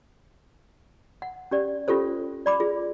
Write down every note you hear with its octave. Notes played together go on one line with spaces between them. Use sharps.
F#5
C#4 G4 D5
C#4 F4 G4 A4 C5
D5 B5 D6
F4 G#4